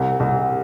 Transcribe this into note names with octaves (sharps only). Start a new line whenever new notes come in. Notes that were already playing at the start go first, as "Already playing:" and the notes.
Already playing: C2
C2